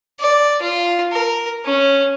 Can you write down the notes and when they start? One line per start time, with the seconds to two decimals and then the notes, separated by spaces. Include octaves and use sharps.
0.20 D5
0.61 F4
1.12 A#4
1.65 C#4